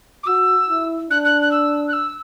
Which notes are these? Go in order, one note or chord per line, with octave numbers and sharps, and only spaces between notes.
D6
F#4 E6
E4
D4 F#6
F#6
F#6
E6
F#6
E6